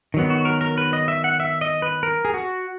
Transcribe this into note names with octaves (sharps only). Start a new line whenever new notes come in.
D#3 F#3 B3
F#4
A#4
A#4
B4
D#5
E5
F#5
E5
D#5
B4
A#4
G#4
F#4